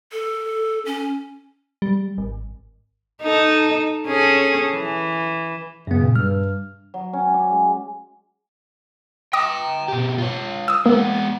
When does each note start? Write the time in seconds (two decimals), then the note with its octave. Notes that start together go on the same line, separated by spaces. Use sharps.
0.12 A4
0.86 C#4
1.82 G3
2.18 G#1
3.22 D#4 A4
4.07 C#4 G#4 A4
4.72 E3
5.87 F#2 C#3 B3
6.00 A#2
6.16 G2 G3 F6
6.94 F#3
7.13 C#4
7.34 D6
7.51 G#3
9.33 G5 A#5 D6 D#6 A#6
9.88 B2 G4
10.18 F4 C#5
10.68 D#6 E6
10.86 G#3 A#3 B3